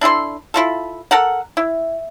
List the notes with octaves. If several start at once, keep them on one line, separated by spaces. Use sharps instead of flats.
D4 E4 A4 C6
E4 F4 A4
A4 A#4 F#5
E4